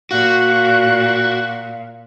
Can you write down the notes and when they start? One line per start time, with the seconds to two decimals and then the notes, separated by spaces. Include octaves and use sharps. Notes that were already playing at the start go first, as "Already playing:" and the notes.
0.11 A#2 F#4 F5 F#6